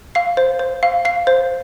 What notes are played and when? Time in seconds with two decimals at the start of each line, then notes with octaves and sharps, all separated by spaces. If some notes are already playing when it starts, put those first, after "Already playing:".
0.15 F5 C7
0.37 C5
0.59 C5
0.83 F5
1.05 F5 C7
1.27 C5